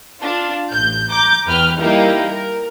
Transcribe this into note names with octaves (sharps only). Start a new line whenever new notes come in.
D4 F4
A1 G6
A#5 D6 G6
E2 B4 G5 F6
G3 A#3 D#4 E4 G4
A#4